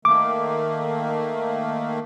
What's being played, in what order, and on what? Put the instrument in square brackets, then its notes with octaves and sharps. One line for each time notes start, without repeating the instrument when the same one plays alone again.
[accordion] D#3 A3 A#3 [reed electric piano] D6